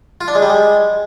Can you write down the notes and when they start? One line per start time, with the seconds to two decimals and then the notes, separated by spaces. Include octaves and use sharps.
0.21 F4
0.28 D4
0.35 G#3
0.42 G3
0.50 G#3